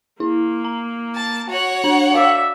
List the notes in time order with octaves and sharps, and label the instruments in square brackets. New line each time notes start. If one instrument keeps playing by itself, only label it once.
[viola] A#3 [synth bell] E4
[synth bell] A#5
[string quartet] A5
[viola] F#4 [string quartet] C#5 F#5
[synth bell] D4
[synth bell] F#4 F5 [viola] D5 E5